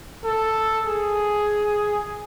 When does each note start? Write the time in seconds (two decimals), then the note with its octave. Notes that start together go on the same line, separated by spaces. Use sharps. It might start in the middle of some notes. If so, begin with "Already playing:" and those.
0.25 A4
0.87 G#4